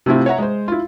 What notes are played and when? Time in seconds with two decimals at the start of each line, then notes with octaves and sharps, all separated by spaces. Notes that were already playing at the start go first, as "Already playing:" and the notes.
0.06 C3 A3 C4 E4 F4
0.26 C#5 E5 F#5 A#5
0.39 G#3 C5
0.68 E4 F4